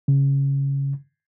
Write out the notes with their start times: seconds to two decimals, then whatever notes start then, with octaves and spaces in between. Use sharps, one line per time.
0.08 C#3